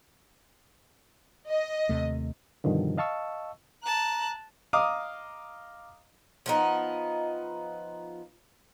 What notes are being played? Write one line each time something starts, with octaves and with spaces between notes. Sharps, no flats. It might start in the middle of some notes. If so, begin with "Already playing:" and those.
D#5
D#2 C3 A3
G2 B2 D3 D#3 F3
D#5 F5 A5 C#6 E6
A5 A#5 F#6
D#5 F5 A#5 D6 D#6 F6
F3 B3 D#4